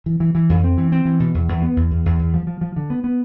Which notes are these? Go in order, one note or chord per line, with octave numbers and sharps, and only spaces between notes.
E3
E3
E3
F2
C4
E3
C4
E3
B2
E2
E2
B3
E2
E2
E2
E2
F3
F3
F3
D3
B3
B3